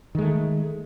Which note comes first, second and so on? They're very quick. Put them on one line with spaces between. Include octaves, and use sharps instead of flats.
D#3 G#3 A3